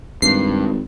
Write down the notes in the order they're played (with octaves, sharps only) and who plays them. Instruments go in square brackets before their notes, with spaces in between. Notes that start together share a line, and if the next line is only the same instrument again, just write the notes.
[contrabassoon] G#1 [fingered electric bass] G2 [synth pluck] C7